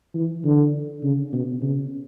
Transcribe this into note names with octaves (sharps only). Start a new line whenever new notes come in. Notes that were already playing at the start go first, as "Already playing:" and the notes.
E3
D3
C#3
B2
C#3